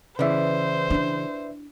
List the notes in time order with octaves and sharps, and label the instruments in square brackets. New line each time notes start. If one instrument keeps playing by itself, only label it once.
[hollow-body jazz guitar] C#3 E3 [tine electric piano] B4 D5 E5 [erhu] C5
[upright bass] D4 E4